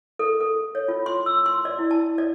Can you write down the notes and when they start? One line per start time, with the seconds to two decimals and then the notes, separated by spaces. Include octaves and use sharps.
0.19 A4
0.40 A4
0.75 C#5
0.88 F4
1.06 C6
1.26 E6
1.46 C6
1.65 D5
1.79 E4
1.91 A5
2.18 D5